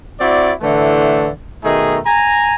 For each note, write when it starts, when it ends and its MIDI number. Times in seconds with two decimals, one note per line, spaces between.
0.20 0.53 60
0.20 0.53 64
0.20 0.53 66
0.20 0.53 74
0.62 1.28 45
0.62 1.28 50
0.62 1.28 52
0.62 1.28 57
1.64 1.98 47
1.64 1.98 51
1.64 1.98 57
1.64 1.98 63
1.64 1.98 68
2.06 2.55 80
2.06 2.55 82